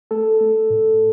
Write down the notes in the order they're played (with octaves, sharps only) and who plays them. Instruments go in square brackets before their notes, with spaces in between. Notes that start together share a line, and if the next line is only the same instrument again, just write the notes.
[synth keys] A3 A4
A3
A2